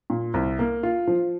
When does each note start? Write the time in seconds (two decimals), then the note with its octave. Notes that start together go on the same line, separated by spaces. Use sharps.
0.10 A#2
0.34 C2
0.59 A#3
0.83 F4
1.07 F3